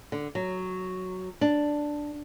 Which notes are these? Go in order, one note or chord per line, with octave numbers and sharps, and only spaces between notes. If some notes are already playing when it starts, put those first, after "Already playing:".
D3
F#3
D4